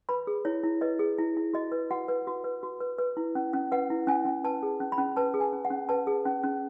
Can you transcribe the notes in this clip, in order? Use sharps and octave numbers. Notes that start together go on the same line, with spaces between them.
B4 B5
G#4
E4 C#5
E4
B4 D#5
G#4
E4
E4
F#4 D#5
B4
F#4 F#5
B4
F#4
B4
F#4
B4
B4
E4
C#4
C#4
B4 F#5
E4
C#4 G#5
C#4
B4 A5
G#4
C#4
B5
C#4
B4 A5
G#4
G#5
C#4
F#5
C#4
B4 A5
G#4
C#4
C#4